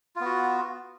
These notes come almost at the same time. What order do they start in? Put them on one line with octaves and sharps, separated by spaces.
F4 B3 F#4